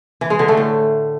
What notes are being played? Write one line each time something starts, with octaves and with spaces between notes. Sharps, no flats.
E3
G#3
D3
A3
A2